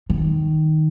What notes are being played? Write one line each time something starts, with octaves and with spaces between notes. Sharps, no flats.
D#3